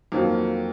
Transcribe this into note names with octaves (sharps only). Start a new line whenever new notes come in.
F2 D#3 F#3 A#3